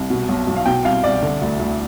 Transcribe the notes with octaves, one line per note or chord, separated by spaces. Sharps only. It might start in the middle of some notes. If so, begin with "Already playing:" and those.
Already playing: C2
B2
B1
B1
F5
B2 G5
C2 F5
C2 D5
D3
D2
D2